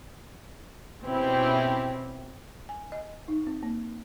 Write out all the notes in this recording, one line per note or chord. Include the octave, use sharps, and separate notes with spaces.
B2 C4 C#4 E4 G4
G#5
D#5
D#4
C4
A#3